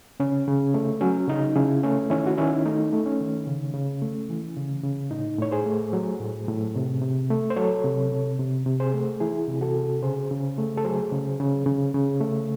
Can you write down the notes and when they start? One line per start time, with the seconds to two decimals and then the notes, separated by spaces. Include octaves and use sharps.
0.20 C#3 C#4
0.47 C#3
0.74 A3
1.01 F#3 C#4
1.28 C#3 D#4
1.55 C#3 C#4 E4
1.84 A3 C#4
2.10 D#3 C#4 E4
2.27 F#4
2.38 D#3 C#4 E4
2.65 A3 D#4
2.93 A3
3.06 C#4
3.21 D#3
3.47 C#3
3.74 C#3
4.02 A3
4.30 E3
4.57 C#3
4.83 C#3
5.11 A2 D#4
5.39 A2 C#5
5.51 G#4 C5
5.66 A3
5.93 F#3
6.20 A2
6.48 A2
6.76 C3
7.02 C3
7.30 A3
7.50 C5
7.56 F#3 A4 C#5
7.84 C3
8.11 C3
8.39 C3
8.66 C3
8.80 G#4 C5
8.94 A3
9.20 E3 E4 G#4
9.48 C3
9.61 F#4 A4
9.76 C3
10.02 C#3 G#4 C5
10.31 C#3
10.58 A3
10.77 A4
10.84 F#3 G#4 C5
11.12 C#3
11.40 C#3
11.66 C#3
11.94 C#3
12.21 A3